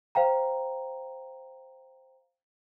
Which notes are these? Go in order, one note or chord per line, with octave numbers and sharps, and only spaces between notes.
C5 F5 G5 A#5